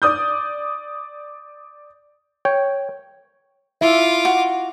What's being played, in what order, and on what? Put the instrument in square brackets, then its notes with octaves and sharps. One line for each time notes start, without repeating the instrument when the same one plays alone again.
[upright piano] D5 D#6 G6
[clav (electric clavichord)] C#5 G5
[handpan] E4 E5 [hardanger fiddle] F4 D6
[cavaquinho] F#4